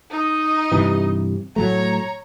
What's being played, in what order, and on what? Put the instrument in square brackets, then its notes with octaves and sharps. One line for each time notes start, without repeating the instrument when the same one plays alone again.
[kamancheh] D#4 D#5
[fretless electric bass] G2 C3 E3
[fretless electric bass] A2 F#3 A3 [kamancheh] C#5 A#5